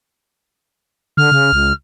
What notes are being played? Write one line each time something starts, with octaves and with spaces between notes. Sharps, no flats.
D3 F6
C#3
C#2